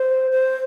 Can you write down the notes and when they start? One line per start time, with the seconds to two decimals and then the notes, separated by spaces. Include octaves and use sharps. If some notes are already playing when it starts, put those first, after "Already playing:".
Already playing: C5
0.31 C5